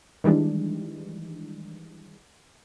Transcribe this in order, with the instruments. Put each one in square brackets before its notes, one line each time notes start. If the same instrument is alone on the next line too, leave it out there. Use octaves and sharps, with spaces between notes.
[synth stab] D#3 E3 G3 G#3 D4